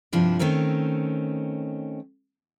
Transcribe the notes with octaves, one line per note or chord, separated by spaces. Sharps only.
G2 C3 F3 D4 E4
D#3 A3 C4 C#4 A#4